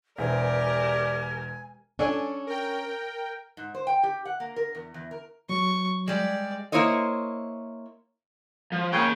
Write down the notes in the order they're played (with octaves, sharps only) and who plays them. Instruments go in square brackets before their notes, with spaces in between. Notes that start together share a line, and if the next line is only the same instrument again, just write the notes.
[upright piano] E1 E3 C5 [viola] G4 A#4 [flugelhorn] D5 [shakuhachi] G#5
[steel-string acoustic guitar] C#4 [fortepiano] D4 A4 G#5
[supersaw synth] A#4 G5
[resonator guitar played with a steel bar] G#2
C5
G5
G4
F#5
A#3
A#4
E2
E2
A#4
[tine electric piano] F#3 [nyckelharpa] C#6
[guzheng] G3 G#3 [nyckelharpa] D5
[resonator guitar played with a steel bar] A#3 E4 C5 C#5 D#5
[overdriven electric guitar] F3
[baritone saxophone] C#3 [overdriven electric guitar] A#3 G5